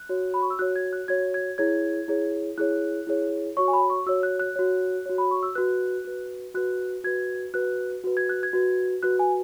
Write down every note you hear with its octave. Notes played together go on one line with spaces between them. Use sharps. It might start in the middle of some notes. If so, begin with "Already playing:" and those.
Already playing: F#6
F#4 C#5
B5
C#6
E6
F#4 C#5 F#6
G#6
F#6
F#4 C#5 G#6
G#6
E4 G#4 C#5 G#6
E4 G#4 C#5
E4 G#4 C#5 F#6
E4 G#4 C#5
F#4 C#5 C#6
G#5
B5
C#6
F#4 C#5 E6
F#6
F#6
F#4 C#5
F#4 C#5
B5
C#6
E6
F#4 B4 F#6
F#4 B4
F#4 B4 F#6
F#4 B4 G#6
F#4 B4 F#6
F#4 B4
G#6
F#6
G#6
F#4 B4
F#4 B4 F#6
G#5